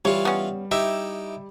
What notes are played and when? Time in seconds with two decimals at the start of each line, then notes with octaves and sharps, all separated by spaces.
0.05 E3 G3 F4 C#5
0.25 B3 C#4
0.71 D#4 E4 G4 E5